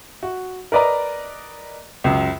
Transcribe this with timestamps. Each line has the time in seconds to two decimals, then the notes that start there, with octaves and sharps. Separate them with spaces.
0.23 F#4
0.72 A#4 B4 D5 D#5 A#5
2.04 C#2 F#2